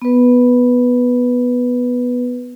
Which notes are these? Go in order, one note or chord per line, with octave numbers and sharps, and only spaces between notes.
B3 B4